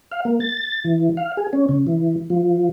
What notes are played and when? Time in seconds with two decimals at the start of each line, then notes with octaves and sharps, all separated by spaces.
0.11 F5
0.25 A#3
0.40 A6
0.84 E3
1.17 F5
1.37 G#4
1.53 C#4
1.69 C#3
1.87 E3
2.30 F3